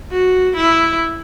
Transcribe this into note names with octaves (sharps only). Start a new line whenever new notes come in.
F#4
E4